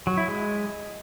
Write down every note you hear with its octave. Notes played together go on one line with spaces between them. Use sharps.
F#3
E4
G#3